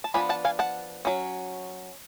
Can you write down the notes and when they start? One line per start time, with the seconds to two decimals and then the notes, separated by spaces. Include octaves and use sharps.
0.04 A5
0.14 F3 B3 D4 G#5 B5
0.29 F#5 A5
0.45 F5 G#5
0.59 F#5 A5
1.05 F#3 C#4